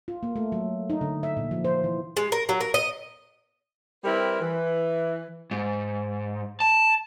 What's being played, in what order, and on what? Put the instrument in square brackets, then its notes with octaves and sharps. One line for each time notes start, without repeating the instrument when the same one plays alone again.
[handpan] F4
A#3
A3
F#3
D#4
D3
E5
A#2
F3
C5
E3
[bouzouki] G#3
A#4
F#3
A#4
D#5
[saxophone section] G3 C4 E4 A#4 B4
E3
[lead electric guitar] G#2
A5